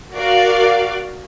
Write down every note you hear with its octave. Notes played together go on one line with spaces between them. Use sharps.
F#4 A#4 D5 F5